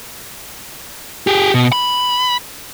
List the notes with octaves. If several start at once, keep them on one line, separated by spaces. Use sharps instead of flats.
G4 G#4
B2
B5